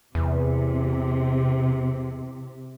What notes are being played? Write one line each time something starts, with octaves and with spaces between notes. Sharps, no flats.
E2 C3